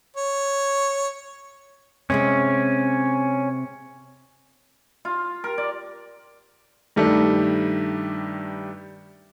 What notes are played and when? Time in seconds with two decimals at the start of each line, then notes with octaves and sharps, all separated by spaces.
0.16 C#5
2.10 C3 G#3 C4 C#4
5.05 F4
5.44 A#4
5.58 D5
6.96 G2 D#3 G3 A3 D4